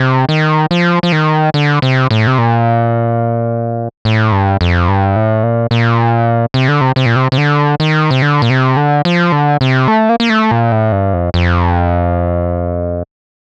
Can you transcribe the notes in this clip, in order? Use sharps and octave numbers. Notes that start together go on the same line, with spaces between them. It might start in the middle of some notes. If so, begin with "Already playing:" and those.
Already playing: C3
D#3
F3
F3
D#3
D3
C3
A2
C3
A#2
A2
G2
F2
G2
A2
A#2
A#2
C3
D3
C3
C3
A#2
C3
C3
D3
D#3
C3
D3
A#2
C3
D3
F3
D3
C3
A3
A#3
A#3
A3
A#2
A2
G2
F2
F2